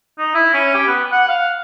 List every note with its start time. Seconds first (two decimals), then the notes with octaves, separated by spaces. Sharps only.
0.18 D#4
0.34 E4
0.54 C#4
0.74 G4
0.87 B3
1.12 F#5
1.28 F5